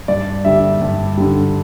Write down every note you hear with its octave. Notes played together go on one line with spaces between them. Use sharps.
G2 D5
D3 G3 E5
G2
D3 G3